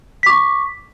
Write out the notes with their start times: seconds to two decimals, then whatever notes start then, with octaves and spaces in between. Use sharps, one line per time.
0.23 B6
0.26 D6
0.30 C#6